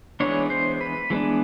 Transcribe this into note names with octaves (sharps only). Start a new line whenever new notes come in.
E3 G#3 B3 D4 C#5
C5
B4
E3 G#3 B3 D4